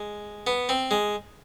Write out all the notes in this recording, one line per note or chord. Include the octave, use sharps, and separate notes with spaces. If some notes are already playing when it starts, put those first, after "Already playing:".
Already playing: G#3
B3
C4
G#3